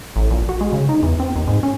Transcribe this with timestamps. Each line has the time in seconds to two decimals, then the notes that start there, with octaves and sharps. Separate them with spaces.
0.16 A1
0.30 A#1
0.49 F#4
0.61 G#3
0.73 C#3
0.89 D#4
1.03 E2
1.20 C4
1.36 D#2
1.48 G#2
1.63 C#4